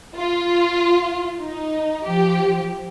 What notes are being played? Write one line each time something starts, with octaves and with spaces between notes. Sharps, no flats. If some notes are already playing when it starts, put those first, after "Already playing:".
F4
D#4
F3 G4